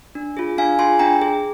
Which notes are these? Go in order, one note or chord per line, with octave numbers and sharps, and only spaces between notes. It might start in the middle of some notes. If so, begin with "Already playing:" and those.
D4
F4 G#4
D4 F5 G#5
F4 G#4 G#5 C6
D4 G5 A#5
G#4